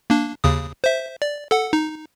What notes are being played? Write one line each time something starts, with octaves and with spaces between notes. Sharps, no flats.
A#3 D4
D#2 C#3 D#6
C5 E5
D5
A4 F#5
D#4